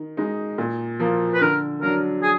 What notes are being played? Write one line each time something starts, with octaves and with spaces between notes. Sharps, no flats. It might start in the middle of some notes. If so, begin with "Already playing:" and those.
Already playing: D#3
G#3 D#4
A#2
F3 A#3
B4
D3 A#4
F#3 D4 A#4
G#4